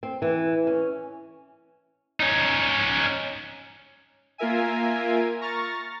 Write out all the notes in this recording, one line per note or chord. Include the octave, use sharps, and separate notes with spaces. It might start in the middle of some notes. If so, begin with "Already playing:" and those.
C4
E3
C#4
C#4 D#4
A#3 F4 A#4 E5 G#5
A#5 C#6 F6 A6